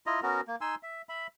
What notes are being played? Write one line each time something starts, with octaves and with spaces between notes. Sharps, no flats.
E4 F4 D#5 A#5
B3 C#4 F#4 A#4
A#3
D#4 G#5 C6 E6
E5
E5 B5